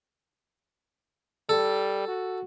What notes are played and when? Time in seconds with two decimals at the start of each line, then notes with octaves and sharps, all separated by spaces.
1.49 G3 A4
2.08 F#4